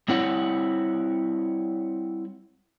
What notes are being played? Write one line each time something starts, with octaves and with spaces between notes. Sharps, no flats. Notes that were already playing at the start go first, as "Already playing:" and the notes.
G3 C4 E4 C#5 F#5